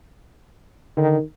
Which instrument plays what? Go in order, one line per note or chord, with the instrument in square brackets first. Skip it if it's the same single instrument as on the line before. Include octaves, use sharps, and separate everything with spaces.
[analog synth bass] D3 [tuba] D#3